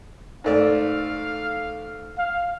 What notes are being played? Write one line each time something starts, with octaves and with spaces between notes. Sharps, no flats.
G#2 A3 D5 F5
F5